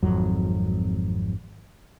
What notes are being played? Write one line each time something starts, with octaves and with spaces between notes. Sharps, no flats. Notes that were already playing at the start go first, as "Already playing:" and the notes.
G#1 F2 F#3